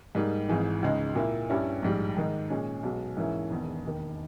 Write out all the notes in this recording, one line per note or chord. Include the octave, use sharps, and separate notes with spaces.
G#2 G3 A#3 D#4
G#1 G#2 E3 G#3
C#2 C#3 G#3 D#4
A#2 A#3 E4
G2 G3 C#4 E4
A#1 G#2 G3
G#2 D#3 G#3 D#4
A#2 G#3 C#4
B1 B2 G#3 C#4
G#2 E3 A#3 C#4 E4
E1 E2 D#3
E1 D#2 D#3